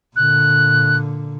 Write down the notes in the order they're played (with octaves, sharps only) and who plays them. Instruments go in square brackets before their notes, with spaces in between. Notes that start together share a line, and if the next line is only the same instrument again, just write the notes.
[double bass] A#2 D3 [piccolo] F#6